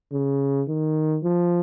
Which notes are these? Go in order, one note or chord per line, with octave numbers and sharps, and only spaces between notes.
C#3
D#3
F3